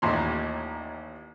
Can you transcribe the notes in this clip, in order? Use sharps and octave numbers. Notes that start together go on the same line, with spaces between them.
A1 D#2 A#2 C6